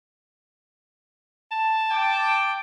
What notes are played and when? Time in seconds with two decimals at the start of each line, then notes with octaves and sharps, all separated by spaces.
1.52 A5
1.91 G5 D6